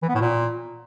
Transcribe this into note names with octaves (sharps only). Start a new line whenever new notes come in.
E3
B3
A2
A#2